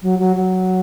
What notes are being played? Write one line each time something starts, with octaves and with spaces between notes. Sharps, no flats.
F#3
F#3
F#3